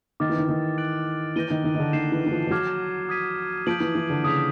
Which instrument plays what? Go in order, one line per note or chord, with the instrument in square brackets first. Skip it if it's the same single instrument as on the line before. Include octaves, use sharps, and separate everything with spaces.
[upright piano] D#3 [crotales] D6 F6 A6
[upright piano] E3
D#3
D#3
[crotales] F#6 A6 D7 F#7
[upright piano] E3 [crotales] G6 A#6 D#7 G7
[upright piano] D#3
D#3
D#3
D3
[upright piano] D#3 [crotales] G6 C7 E7
[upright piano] E3
E3
F3
F3
[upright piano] F#3 [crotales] D6 F6 G#6
[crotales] D#6 G#6 B6 D#7
[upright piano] F3 [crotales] G6 B6 D7 F#7
[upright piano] E3
E3
D3
[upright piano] C#3 [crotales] D#6 G#6 B6